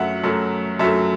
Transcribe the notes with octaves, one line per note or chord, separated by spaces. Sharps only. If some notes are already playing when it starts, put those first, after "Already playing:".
Already playing: F#2 F#3 A3 E5 F#5
F#2 F#3 A3
F#2 F#3 A3 E5